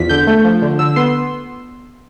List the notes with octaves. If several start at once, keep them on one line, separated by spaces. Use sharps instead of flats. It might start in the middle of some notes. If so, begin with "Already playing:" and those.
Already playing: E2 F3 B6
D3 G6
A3
F3
D3
D3 E6
B3 C6